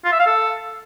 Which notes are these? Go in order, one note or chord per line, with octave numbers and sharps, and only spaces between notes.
F4
E5
F5
A4